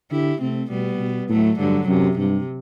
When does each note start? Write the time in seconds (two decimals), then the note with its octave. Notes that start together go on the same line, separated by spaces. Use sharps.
0.11 D3 E4 G4
0.41 C3 A3 C4
0.70 B2 G3 B3
0.99 B2
1.29 A2 F#3 A3
1.59 G2 D3 F#3
1.88 F#2 C3
2.18 G2 C3